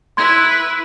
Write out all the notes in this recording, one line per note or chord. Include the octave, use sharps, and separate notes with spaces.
E4 B4 C6 G#6